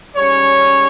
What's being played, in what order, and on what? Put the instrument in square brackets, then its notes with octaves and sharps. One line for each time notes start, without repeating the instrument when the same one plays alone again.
[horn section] G#2 G3 C#4 C#5